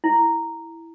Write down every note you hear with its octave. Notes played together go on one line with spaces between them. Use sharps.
E4